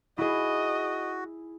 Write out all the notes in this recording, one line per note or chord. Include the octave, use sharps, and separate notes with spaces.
E4 F#4 G#4 D#5